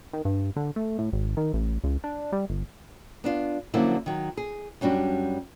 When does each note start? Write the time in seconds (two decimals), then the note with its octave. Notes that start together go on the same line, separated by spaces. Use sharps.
0.13 D#3
0.25 G2
0.56 D3
0.76 A3
0.98 A2
1.13 G#1
1.37 D#3
1.54 A1
1.84 C#2
2.04 D4
2.32 G3
2.50 G1
3.24 B3 D4 F4
3.74 D3 F3 F#3 A#3 C#4 E4
4.06 D#3 F#3
4.37 G#4
4.81 F#2 G3 C#4 D4 F#4